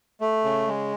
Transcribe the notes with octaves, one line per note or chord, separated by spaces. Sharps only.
A3
C#3
G#3